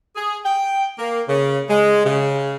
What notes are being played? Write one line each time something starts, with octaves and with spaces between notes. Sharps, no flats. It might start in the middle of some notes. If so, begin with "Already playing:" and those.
G#4
G5
A#3
C#3
G#3
C#3